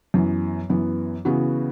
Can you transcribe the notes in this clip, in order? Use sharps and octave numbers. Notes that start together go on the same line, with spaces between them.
F#2 E3 B3
F#2 E3 B3
C#3 E3 B3 F#4